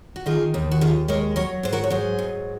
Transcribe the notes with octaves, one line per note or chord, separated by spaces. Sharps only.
F#4
D#3 F4 G#4
D#2
F#4
D#2 F4 G#4
G#3 A#4 C#5
F#3 A#4 C#5
G#2 C5
F#4 A#4
C#5
F#3 G#4 C5
G#2